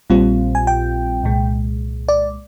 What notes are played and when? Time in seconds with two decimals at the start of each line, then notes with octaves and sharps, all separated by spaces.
0.10 A#1 A#2 G3 C4 F4
0.55 G#5
0.67 G5
1.23 C2 A#2 G#3
2.09 D5